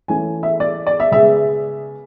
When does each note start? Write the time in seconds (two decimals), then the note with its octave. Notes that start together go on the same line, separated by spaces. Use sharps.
0.08 E3 A3 C#4 G#5
0.43 E5
0.60 D5
0.87 D5
1.00 E5
1.12 C#3 G#3 B3 E5